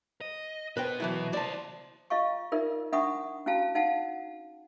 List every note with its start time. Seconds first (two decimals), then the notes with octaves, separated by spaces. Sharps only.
0.21 D#5
0.77 B2 B3 B4 C5 G5
1.00 E3 F#3 E4
1.33 E4 C5 D5 A5
2.10 F4 D#5 F5 C#6
2.52 D#4 F4 A#4 D5 E5
2.93 D4 E5 F#5 B5 C#6 D#6
3.46 C#4 E4 F#4 F5 A5
3.75 D#4 F5 F#5 A5